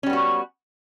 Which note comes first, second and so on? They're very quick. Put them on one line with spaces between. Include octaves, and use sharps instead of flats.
C#4 G3 B3 F#4